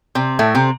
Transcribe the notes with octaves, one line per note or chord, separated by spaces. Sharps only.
C3 C4
A2 A3
C3 C4